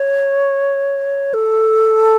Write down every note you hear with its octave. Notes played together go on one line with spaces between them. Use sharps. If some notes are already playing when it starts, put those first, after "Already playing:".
Already playing: C#5
A4